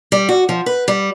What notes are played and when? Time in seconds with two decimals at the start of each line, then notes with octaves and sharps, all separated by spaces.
0.12 G3
0.29 F#4
0.49 F3
0.66 B4
0.88 G3